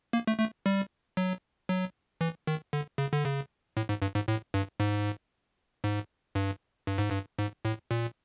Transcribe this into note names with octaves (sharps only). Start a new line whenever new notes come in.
A#3
A3
A3
G3
F#3
F#3
E3
D#3
D3
C#3
D3
C#3
A2
G#2
G2
G#2
A2
G2
G#2
G#2
G2
G2
G#2
G2
G#2
A2
A#2